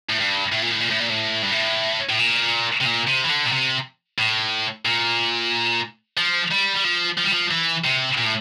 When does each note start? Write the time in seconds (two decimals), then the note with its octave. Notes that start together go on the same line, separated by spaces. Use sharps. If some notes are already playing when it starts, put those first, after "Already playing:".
0.09 A2
0.19 G2
0.52 A2
0.62 A#2
0.71 A2
0.81 A#2
0.90 A2
1.00 A#2
1.09 A2
1.42 G2
1.52 A2
2.09 A2
2.19 A#2
2.81 C3
2.85 A#2
3.07 C3
3.24 E3
3.29 D3
3.45 A#2
3.52 C3
4.18 A2
4.85 A#2
6.17 F3
6.52 G3
6.76 G3
6.84 F3
7.18 F3
7.24 G3
7.32 F3
7.51 E3
7.84 C3
8.17 A#2
8.25 A2